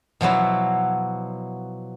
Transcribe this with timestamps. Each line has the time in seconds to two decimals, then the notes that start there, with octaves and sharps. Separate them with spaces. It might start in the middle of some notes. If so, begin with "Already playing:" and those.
0.21 B2 F3 F#3 E4